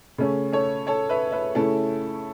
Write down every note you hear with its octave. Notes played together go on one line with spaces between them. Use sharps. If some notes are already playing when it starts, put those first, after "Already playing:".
C#3 A3 C#4
A4 C#5
A4 C#5
B4 E5
B4 E5
C#3 A3 C#4 E4 A4